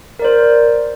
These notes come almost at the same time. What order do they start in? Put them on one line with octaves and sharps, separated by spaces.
A#4 D5 C5